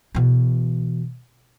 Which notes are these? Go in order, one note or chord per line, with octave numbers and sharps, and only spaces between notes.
B2 E3